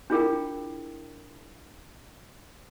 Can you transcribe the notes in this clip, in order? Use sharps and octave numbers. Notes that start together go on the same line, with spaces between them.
D4 E4 F4 G#4 A#4 G5